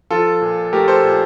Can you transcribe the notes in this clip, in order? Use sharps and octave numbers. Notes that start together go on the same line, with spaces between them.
F3 F4 A4
A#2
A3 G4 A#4
A4 C5
A#2